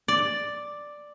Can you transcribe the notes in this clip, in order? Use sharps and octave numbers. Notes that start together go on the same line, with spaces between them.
D5